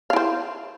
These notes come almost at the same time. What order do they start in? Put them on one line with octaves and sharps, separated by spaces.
F5 E4 C5